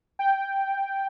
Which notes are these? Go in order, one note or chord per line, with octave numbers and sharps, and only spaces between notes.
G5